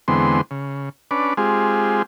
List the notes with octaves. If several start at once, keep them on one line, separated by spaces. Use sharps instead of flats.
E2 D3 G#3 B3 C4 C6
C#3
C#4 D4 B4 D5
G#3 C4 F4 G4 G#4